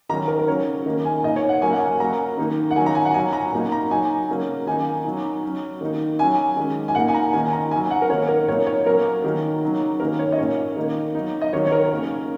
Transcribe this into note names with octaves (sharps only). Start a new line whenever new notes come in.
D#3 F#3 C#4 A#5
A#4
A#4
C#3 F#3 C#4 C#5
D#3 A#3 C#4
G#5
A#2 A#3 D#4 D#5
C#5
F#5
F#3 A#3 C#4 G#5
F#5
G#5
F#3 A#3 C#4 A#5
D#3 A#3 D#4
F#5
D#3 F#3 C#4 G#5
A#5
G#5
F#5
F#3 C#4 G#5
A#5
A#2 F#3 A#3 D#4
A#5
F#3 D#4 G#5
C#3 F#3 A#3 C#4
D#3 A#3 D#4 G#5
F#3 D#4
F#3 C#4
D#3 A#3 D#4
F#3 C#4 G#5
D#3 G#3 C#4
G#5
A#2 A#3 D#4 F#5
G#5
A#5
D#3 A#3 C#4 G#5
A#5
F#3 C#4 G#5
F#5
A#4
D#3 A#3 C#4 C#5
A#4
A#2 F#3 A#3 D#4 C#5
C#5
F#3 A#3 C#4 A#4
D#3 F#3 A#3 C#4
C#3 F#3 D#4
D#3 A#3 C#4 A#4
C#5
D#5
A#2 A#3 C#4 C#5
D#3 A#3 D#4
F#3 D#4
D#5
D#3 F#3 D#4 C#5
C#5
A#4
C#3 A#3 C#4